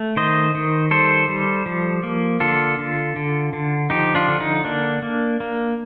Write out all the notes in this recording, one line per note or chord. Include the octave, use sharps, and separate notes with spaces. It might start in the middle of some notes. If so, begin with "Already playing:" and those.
Already playing: A3
D#3 C5 D#5
D#3
G3 A4 C5
G3
F3
A#3
D3 F4 A4
D3
D3
D3
F3 D#4 G4
D4 F4
D3
D#4
A#3 D4
A#3
A#3